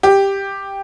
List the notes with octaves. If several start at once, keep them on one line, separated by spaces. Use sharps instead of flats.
G4